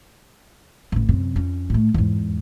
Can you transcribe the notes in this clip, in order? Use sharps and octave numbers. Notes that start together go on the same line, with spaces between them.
A1 C#3
F#2 C3
F2 C#4
A2 A3
E2 G#2